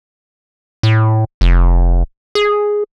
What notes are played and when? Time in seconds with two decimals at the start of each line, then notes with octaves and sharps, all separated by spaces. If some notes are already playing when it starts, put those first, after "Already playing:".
0.83 A2
1.41 F1
2.35 G#4